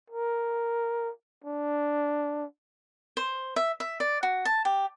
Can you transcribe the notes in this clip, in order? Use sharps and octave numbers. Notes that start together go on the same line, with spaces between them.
A#4
D4
C5
E5
E5
D5
F#4
A5
G4